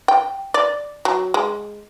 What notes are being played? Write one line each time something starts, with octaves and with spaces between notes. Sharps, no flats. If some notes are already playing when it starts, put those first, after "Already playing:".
G5
D5
F#3
G#3